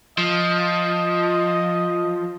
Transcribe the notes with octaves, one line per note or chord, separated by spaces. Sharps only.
F3 D#5